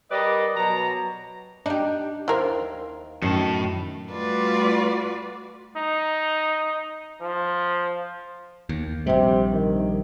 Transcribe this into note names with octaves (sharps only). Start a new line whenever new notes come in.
G3 A#4 B4 D5 D#5
B2 F#3 A#5
D4 D#4 G4
D#2 E4 A#4 C5 F5
F#2 A2 D#3 A5
G3 A3 F4 F#4 B4 D5
D#4
F3
D#2
A#1 C3 G3
D#3